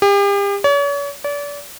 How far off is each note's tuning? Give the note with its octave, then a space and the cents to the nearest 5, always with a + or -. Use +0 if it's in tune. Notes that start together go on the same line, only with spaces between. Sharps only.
G4 +40
C#5 +40
D5 -35